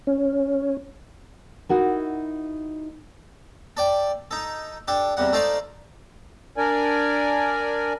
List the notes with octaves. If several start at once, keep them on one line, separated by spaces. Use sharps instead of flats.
C#4
D#4 E4 F#4 A#4
A4 D5 G5
D#4 A4
D4 G4 A4
E2 C3 G3 F#5
A3 D#4 A4 C5 D5 F5
D4 A#4 D5 G#5